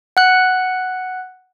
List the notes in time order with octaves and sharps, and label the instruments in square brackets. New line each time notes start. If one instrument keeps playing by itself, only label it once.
[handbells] F#5 F#6